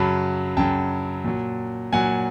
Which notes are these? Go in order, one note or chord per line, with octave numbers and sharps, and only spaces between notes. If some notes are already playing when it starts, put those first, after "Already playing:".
Already playing: F#2 C#3 F#3 A5 B5
F#2 C#3 F#3 G5 A5
A#2 F#3
A#2 F#3 F#5 G#5